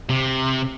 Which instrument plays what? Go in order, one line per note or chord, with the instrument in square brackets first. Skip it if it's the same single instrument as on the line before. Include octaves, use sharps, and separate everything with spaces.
[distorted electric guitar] C3